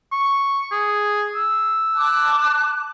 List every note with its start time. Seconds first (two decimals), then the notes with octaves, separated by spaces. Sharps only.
0.12 C#6
0.72 G#4
1.36 E6
1.96 A5 D6 F#6